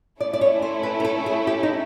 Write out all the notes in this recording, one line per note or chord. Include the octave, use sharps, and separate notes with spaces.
A3 C#4 E4 D5
D5
C#5
C5
B4
A#4
A4
G#4
G4
D#4